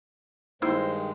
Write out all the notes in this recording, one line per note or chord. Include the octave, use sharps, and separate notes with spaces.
G2 D#3 G#3 A#3 D#4 E4 C5